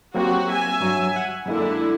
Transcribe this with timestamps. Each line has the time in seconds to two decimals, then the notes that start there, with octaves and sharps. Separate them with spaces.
0.15 F#3 A#3 C4 F#4 G4
0.50 E5 G#5
0.80 G2 F#3
1.16 F#5
1.46 F#2 D3 G#3 A#3 E4